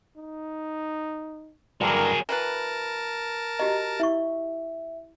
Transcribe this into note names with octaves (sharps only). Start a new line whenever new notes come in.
D#4
G2 D3 E3 F#3 G#4 A#4
E3 F#3 A#4 B4 A5
F#4 G4 D#5 A#5
E4 E5 C#6